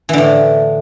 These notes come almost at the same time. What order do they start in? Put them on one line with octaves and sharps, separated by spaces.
E3 D3 A2